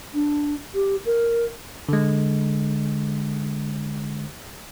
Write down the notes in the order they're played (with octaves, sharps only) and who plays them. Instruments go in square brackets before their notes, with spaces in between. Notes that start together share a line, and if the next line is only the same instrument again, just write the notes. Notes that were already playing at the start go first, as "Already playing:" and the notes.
[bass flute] D4
G4
A#4
[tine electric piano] D3 G#3